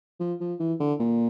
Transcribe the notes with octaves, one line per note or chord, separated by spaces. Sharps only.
F3
F3
E3
D3
A#2